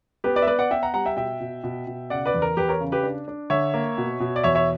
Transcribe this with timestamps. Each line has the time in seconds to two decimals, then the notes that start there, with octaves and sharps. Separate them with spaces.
0.24 B3 G4 B4
0.36 B4 D5
0.42 E5
0.47 B3 B4 D5
0.59 D5 F#5
0.70 B3 E5 G5
0.83 F#5 A#5
0.94 G3 F#5 A#5
1.05 E5 G5
1.17 B2 E5 G5
1.41 B2
1.64 B2
1.87 B2
2.10 C#3 D5 F#5
2.25 B4 D5
2.34 E2
2.42 A#4
2.57 E2 G4 B4
2.69 A#4 C#5
2.80 C#3
2.92 G4 B4
3.03 D4
3.28 D4
3.50 D3 C#5 E5
3.74 A#3
3.98 B2
4.20 B2
4.36 D5
4.44 E2 C#5 E5
4.55 C#5 E5